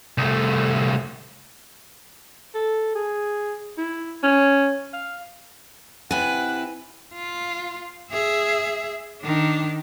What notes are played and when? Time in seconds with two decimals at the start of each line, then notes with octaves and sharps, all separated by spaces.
0.18 C2 A3
2.55 A4
2.95 G#4
3.78 E4
4.23 C#4
4.93 F5
6.11 C3 E4 B4 F#5 G#5
7.14 F4
8.11 G#4 E5
9.22 D#3 D4